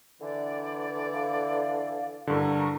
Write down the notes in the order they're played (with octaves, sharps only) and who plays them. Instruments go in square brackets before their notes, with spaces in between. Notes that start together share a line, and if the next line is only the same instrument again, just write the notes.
[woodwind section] D3 E3 [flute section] D5
[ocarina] F5
[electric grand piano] G2 D3 [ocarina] E4 [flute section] A#4 C#6